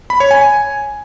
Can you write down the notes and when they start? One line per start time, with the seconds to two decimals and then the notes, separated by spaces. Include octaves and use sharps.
0.10 B5
0.20 C#5
0.31 G#5
0.41 G#5